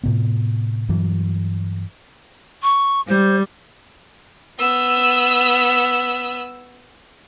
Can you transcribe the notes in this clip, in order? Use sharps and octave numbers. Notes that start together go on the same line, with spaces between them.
A2 C3 B3
G2 E3 F#3
C#6
G3 C5
B3 E6